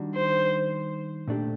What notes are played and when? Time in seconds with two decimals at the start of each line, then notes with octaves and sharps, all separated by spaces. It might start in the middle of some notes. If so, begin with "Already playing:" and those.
Already playing: D#3 G3 D4 F#4
0.15 C5
1.28 A#2 A3 D4 G4